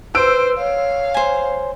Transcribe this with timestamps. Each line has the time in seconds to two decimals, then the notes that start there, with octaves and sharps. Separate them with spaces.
0.15 B4 C5 E6 D7
0.58 C#5 F5
1.14 C5 G#5